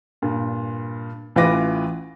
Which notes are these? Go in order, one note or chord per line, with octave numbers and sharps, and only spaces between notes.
G2 A#2
A1 E3 F4 B4 D6 A#6